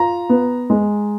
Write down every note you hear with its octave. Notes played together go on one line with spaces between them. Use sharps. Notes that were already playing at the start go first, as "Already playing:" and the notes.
Already playing: F4 A#5
B3
G#3